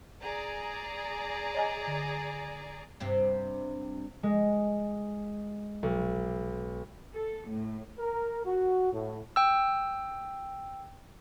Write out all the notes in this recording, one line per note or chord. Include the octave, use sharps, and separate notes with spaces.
G#4 D5 A#5
C#5 D#5 G#5
D3
G2 C3 C4
G#3
B1
A4
A2
A#4
F#4
A2
G5 E6